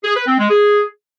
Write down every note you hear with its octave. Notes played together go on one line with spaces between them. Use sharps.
G#4
B4
C4
G#3
G#4